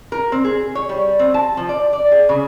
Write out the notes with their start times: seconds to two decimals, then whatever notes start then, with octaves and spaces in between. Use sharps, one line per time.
0.12 A#4
0.32 C4
0.44 G#4
0.75 C#5
0.89 G3
1.19 C4
1.34 A5
1.57 F3
1.69 D5
1.93 D5
2.12 G#4
2.29 C#3